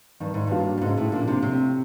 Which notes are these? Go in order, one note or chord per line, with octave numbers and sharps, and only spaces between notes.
G2 D#3
G#2
G2 F#3 A#3 D4 F4
G2
G#2 C#3
A2
A#2 F3 A#3 D4
C3
A2 C3